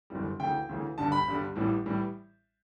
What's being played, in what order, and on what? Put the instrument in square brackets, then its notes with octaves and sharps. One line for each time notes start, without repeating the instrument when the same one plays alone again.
[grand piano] G1 F#2 E3 G3
D2 C#3 E3 G5
D2 C#3 E3
G1 G2 D3 G3 A5
B5
G1 G2 D3 G3
A1 A2 E3 G3
A2 E3 G3